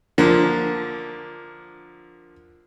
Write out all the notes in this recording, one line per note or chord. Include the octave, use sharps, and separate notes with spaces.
D3 F3 A#3